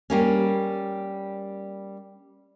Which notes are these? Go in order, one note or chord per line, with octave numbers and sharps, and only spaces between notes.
G3 A#3 C#4